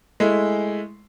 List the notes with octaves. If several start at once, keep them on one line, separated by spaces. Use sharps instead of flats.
G#3 A3 E4